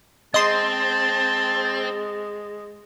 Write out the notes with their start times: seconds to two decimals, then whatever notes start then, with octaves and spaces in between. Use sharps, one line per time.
0.34 G#3 C4 D#5 A5 C6